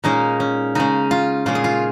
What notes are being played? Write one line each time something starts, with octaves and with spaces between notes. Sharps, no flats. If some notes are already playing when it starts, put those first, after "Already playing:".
A#2 G#3 C#4 D#4
C#4
C#3 G#3 C#4 D#4
F4
A#2 G#3 C#4 F4
G#4
F4